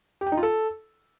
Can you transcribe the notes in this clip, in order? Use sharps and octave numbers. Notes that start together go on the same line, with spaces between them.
G4
G5
D#4
F4
A4